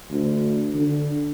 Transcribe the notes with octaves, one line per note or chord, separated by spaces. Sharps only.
D2
D3